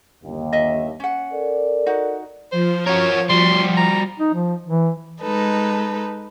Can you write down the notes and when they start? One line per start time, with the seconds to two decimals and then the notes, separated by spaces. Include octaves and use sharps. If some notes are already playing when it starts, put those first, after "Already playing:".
0.24 G1 D#2
0.53 D#5 E5
1.00 C#4 F#5
1.32 A4 A#4 D5
1.86 D#4 F#4 F#5
2.52 F3 C5
2.87 F#4 A#4 C#5
3.30 G3 F#4 C6
3.77 A#5
4.20 D#4
4.34 F3
4.67 E3
5.21 G#3 D#4 A4 B4